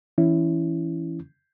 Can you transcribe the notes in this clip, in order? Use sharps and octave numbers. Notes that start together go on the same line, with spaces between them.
E3 C#4 E4